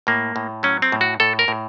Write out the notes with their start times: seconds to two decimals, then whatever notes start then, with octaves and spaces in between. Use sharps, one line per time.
0.07 A2 A#3
0.36 A2
0.63 F#3 C#4
0.82 C4
0.92 A2
1.01 F#4
1.20 A2 A4
1.39 A#4
1.48 A2